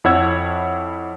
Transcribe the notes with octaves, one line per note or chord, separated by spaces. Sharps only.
F2 E4 C#5 F#5 E6 G#6